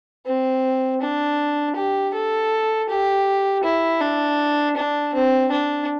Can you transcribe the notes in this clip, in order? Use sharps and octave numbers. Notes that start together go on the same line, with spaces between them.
C4
D4
G4
A4
G4
E4
D4
D4
C4
D4